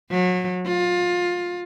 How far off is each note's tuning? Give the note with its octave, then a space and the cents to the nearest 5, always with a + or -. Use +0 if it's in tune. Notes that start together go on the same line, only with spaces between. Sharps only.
F#3 -30
F4 +20